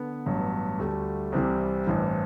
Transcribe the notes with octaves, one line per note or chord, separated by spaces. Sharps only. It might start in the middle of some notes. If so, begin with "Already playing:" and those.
Already playing: D3 B3
A1 G2 F#3
D2 D3 G3 A3
C2 C3 E3 G3 C4
A1 G2 E3